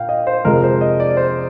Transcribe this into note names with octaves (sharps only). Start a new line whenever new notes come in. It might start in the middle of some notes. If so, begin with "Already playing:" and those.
Already playing: A#2 F5 G5
D#5
C5
F2 C3 F3 G#3 A#4
C5
D#5
D5
C5